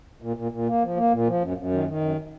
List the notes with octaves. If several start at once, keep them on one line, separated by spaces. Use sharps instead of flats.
A#2
A#2
A#2
A#3
F3
A#3
A#2
F3
F#2
F#2
D#3
D#3
F#2